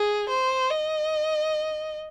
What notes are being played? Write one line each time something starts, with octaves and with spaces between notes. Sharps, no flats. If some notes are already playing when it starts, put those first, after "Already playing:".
Already playing: G#4
C5
D#5